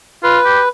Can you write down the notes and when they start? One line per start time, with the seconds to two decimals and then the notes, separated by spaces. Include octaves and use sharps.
0.24 F4 B4
0.45 G4